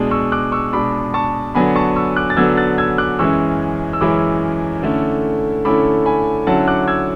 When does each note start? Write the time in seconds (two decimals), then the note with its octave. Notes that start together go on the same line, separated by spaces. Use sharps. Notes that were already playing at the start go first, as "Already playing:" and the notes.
Already playing: B2 G#3 D4
0.11 C#6 E6
0.32 D6 F#6
0.52 C#6 E6
0.73 B2 G#3 D4 B5 D6
1.14 A5 C#6
1.55 D3 F#3 B3 D4 G#5 B5
1.76 A5 C#6
1.96 C#6 E6
2.16 D6 F#6
2.30 A6
2.37 D3 F#3 B3 D4 E6 G#6
2.57 F#6 A6
2.78 E6 G#6
2.98 D6 F#6
3.19 F#2 E3 G#3 C#4 E4 C#6 E6
3.93 E6
4.01 F#2 E3 G#3 C#4 E4 B5 D6
4.83 D3 A3 C#4 E4
5.65 D3 A3 C#4 E4 B5 D6
6.06 G#5 B5
6.47 D3 F#3 C#4 E4 F#5 A5
6.68 D6 F#6
6.88 E6 G#6